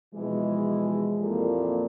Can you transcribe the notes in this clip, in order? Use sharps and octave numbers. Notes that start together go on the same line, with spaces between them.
B2 E3 F3 G#3
F2 A#2 E3 A#3 G4 A4